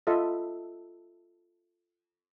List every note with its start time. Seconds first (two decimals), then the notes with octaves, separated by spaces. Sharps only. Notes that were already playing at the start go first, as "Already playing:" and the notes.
0.07 F4 A4 D#5 E5